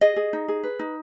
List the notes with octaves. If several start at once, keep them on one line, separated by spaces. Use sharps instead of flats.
G#4 D#5
G#4
D#4
G#4
B4
D#4